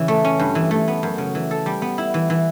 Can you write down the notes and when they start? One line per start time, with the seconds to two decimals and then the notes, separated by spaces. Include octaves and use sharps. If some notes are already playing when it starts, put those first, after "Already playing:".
Already playing: C#3 E3
0.08 A3
0.25 C#4
0.39 G2
0.55 E3
0.71 A3
0.88 B3
1.03 F#2
1.18 C#3
1.35 E3
1.51 A4
1.66 G3
1.82 B3
1.98 E4
2.14 E3
2.30 E3